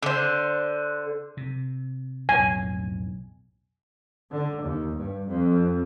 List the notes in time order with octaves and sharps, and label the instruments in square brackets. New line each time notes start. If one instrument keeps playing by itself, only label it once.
[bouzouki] D3 C5
[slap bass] C3
[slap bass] B1 F2 A2 [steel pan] G#5
[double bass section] D3
D#2
G2
F2